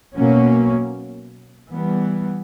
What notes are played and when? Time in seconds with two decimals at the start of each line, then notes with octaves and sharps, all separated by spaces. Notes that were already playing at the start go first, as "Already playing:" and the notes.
0.17 B2 F#3 A#3 C#4
1.69 E3 G3 B3